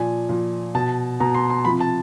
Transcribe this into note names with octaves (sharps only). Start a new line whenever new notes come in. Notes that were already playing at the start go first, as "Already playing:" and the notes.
Already playing: A#2 F3 G#5
A#2 F3
B2 A5
B2 A#5
C6
C6
C3 F3 B5
A5